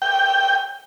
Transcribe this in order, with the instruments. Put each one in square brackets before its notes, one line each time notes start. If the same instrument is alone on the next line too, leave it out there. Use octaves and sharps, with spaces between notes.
[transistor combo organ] G5